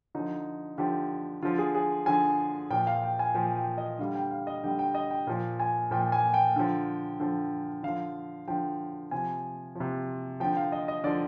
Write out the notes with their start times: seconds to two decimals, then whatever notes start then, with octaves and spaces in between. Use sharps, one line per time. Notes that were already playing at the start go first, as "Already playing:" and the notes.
0.15 D3 F3 D#4
0.78 D3 F3 G4
1.42 D3 F3 F4
1.58 G#4
1.75 G#4
2.06 D3 F3 G#5
2.70 A#2 F3 G5
2.87 F5
3.03 G5
3.19 G#5
3.34 A#2 F3 G5
3.56 G5
3.78 D#5
3.99 D3 G3 F5
4.15 G5
4.31 F5
4.47 D#5
4.64 D3 G3 G5
4.79 G5
4.95 D#5
5.11 G5
5.27 A#2 F3
5.60 G#5
5.91 A#2 F3 G5
6.12 G#5
6.34 G5
6.56 D3 F3
7.20 D3 F3
7.83 D3 F3 F5
8.48 D3 F3 G5
9.11 C3 F3 G#5
9.75 C3 F3
10.40 D3 F3 G5
10.57 F5
10.72 D#5
10.88 D#5
11.04 D3 F3 D5